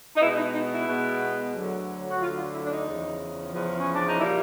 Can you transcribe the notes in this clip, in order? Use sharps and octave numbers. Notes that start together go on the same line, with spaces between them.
D#4
B2 G#3 B3 E4
D#4
D#4
E4
B2 G#3 B3
D2 D3 F#3
F#4
D2 D3 F#3 F4
F4
E4
D4
D#4
E2 C#3 F3
E2 C#3 F3
C#4
D4
D#4
A#2 G3 A#3 E4